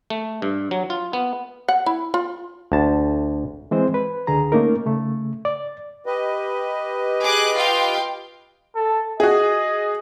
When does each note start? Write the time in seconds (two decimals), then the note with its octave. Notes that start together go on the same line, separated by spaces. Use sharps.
0.10 A3
0.42 G2
0.71 F#3
0.90 F4
1.13 B3
1.68 F#5
1.86 E4
2.14 F4
2.72 D2 A5
3.71 E3 G#3 C4 C5
3.94 B4
4.27 C#2 D3 G#4 A#5
4.52 A3 A#3 C#4 D#4 A#4
4.86 C#3 A3
5.45 D5
6.06 G4 B4 D#5
7.22 G#4 D6 F#6
7.54 F4 F5 G5
8.76 A4
9.20 F#4 G#4 D#5